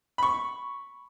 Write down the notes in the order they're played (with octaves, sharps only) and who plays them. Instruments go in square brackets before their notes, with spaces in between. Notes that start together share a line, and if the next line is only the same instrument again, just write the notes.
[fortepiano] B5 C#6